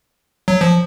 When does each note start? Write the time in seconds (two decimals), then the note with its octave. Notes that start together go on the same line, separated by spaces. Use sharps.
0.48 F#3
0.61 F3